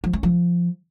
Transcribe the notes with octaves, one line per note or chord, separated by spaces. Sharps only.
F3
C#4
F3